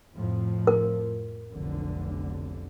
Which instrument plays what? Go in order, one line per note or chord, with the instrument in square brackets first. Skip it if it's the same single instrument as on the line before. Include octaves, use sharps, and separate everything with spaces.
[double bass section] F2 A2 F3
[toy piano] A#4
[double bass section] F1 B1 D3